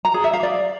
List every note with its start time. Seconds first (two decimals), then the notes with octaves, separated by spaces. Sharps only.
0.05 A#5
0.14 G#4
0.24 E5
0.33 F5
0.43 D5